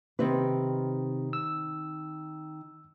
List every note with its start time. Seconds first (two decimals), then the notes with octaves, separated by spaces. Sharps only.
0.19 C3 D#3 C4 B4
1.33 E6